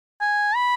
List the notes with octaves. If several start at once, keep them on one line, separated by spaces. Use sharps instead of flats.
G#5
B5